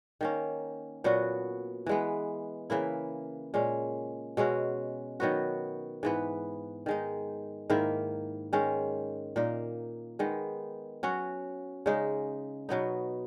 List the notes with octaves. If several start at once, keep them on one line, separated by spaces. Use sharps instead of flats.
D#3 A#3 C#4
A#2 F#3 B3 F#4
E3 G#3 B3
C#3 E3 A#3 E4
A#2 G#3 C#4
B2 G#3 C#4 F#4
D#3 F#3 B3 F#4
G#2 E3 B3
D#3 G#3 D#4
G#2 D#3 A#3 E4
D#3 G#3 C#4
A#2 A#3 D#4
D#3 G#3 B3
F#3 C#4 F#4
C#3 G#3 D#4
B2 F#3 B3 D#4